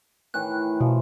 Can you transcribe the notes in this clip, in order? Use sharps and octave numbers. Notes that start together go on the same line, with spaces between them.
A2 D#3 E3 F#6
B2 E3 F3